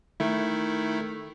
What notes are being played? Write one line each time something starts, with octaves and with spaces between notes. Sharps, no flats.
D#3 A3 E4